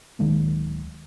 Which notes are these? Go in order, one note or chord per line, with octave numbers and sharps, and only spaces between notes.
D1 D#3 G#3 A#3